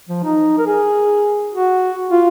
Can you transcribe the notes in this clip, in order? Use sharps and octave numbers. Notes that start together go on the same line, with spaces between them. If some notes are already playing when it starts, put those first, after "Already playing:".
F3
D#4
A#4
G#4
F#4
F4